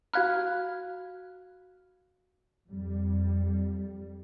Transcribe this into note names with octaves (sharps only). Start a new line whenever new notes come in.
F#4 F5 B5 F6 F#6 G#6
F2 G3